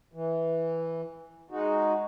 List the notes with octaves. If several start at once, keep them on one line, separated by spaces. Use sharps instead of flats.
E3
G#3 D#4 F#4